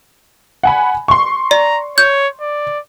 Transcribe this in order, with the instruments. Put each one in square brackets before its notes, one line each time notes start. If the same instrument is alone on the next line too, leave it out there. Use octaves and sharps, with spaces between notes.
[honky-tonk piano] F#5 G#5 B5
C6 C#6
[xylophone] D5 [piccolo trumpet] A#5
[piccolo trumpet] C#5 [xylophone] G6
[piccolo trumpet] D5